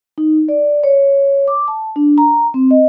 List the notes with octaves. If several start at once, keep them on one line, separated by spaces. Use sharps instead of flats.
D#4
D5
C#5
D6
A5
D4
A#5
C4
D#5